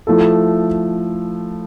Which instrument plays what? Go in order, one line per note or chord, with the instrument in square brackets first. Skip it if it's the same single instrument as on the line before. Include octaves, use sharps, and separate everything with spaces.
[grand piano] F3 A3 E4 A4